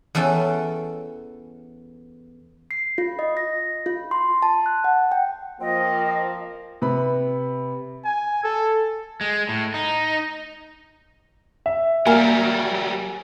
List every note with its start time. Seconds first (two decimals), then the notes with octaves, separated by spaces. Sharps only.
0.15 E2 C#4 A4 G5
2.71 C7
2.98 F4
3.19 D#5
3.37 A#6
3.86 F4
4.11 C6
4.42 A5
4.66 F#6
4.84 F#5
5.12 G5
5.60 F3 A#3 C4 D#5
6.82 C3 B4 B5
8.05 G#5
8.44 A4
9.21 G#3
9.49 A2
9.74 D#4
11.66 E5
12.07 F#3 G3 A#3 G#5